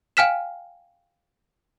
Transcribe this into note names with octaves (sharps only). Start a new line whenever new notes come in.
F5 G5 G#5 F6 B6 E7